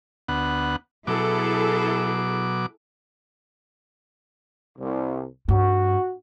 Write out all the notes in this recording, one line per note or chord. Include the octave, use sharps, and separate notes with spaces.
D2 B3 F#5
B2 F#3 E4 G#4 A4 D6
C2
G2 F#4